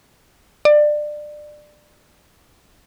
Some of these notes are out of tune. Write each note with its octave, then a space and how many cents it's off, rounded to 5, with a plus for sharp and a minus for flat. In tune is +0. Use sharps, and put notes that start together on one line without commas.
D5 +25